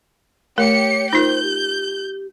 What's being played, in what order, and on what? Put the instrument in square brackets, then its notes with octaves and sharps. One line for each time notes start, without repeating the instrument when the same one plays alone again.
[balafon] A3 A#4 [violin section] G4 C#7 [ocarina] C#5
[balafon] D#4 F4 A#4 [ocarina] C5 [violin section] G6
[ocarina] G4